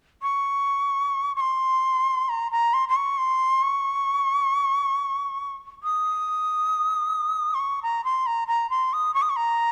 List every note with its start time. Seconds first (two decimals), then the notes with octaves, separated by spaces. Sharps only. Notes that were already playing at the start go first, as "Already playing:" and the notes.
0.22 C#6
1.36 C#6
1.41 C6
2.29 A#5
2.52 A#5
2.74 C6
2.89 C6
2.96 C#6
3.18 C6
3.62 C#6
5.83 D#6
7.54 C6
7.59 C#6
7.83 A#5
8.04 C6
8.26 A#5
8.48 A#5
8.70 C6
8.93 D#6
9.14 C#6
9.22 D#6
9.29 C#6
9.36 A#5